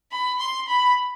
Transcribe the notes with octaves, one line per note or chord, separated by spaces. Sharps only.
B5
C6
B5